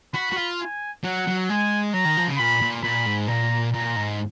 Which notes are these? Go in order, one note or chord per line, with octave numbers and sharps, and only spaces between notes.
F#4 B5
F#4
F4
G#5
F#3 F#5
F#3
G#3 G#5
F#3 A#5
D#3
F3
C#3
A#2 B5
A#2
A#2 B5
G#2
A#2 A#5
A#2 A#5
G#2